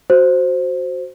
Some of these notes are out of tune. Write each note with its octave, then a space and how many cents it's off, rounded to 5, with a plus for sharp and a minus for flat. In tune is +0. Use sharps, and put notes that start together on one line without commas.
F#4 +0 C5 +0